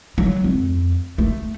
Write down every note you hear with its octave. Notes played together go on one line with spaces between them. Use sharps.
F#3
F2
A3